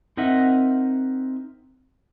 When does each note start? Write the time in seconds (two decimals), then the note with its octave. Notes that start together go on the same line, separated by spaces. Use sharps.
0.17 C4 D#4 A#4 D#5 E5 F#5